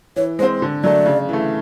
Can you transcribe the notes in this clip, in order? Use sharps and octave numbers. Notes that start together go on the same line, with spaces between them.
E3 C#5
G#3 C4 C5
D3
F#3 A3 D5
C#3
E3 A3